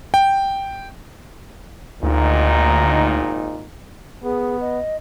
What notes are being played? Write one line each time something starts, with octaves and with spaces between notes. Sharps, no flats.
G5
G#1 D2 A#2 D#4
B3 G#4
D#5